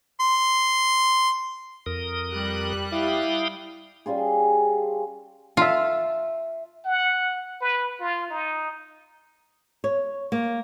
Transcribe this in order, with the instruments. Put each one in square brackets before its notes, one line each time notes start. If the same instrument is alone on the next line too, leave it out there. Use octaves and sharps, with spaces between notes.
[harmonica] C6
[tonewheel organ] F2 A#4 D#6
[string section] G3 F#6
[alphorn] E4 [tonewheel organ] F5 G5 D#6
[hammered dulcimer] G3 C#4 F4 G#4
[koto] F4 [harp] E5 A5
[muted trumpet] F#5
B4
F4
D#4
[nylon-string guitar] C#5
A#3